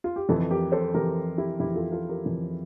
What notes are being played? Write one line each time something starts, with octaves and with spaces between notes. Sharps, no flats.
F4
G4
F2 E3 F4 A4
G4 A#4
A4 C5
F2 E3 G4 A#4
E4 G4
F2 E3 E4 G4
F4 A4
F4 A4
G4 A#4
F2 E3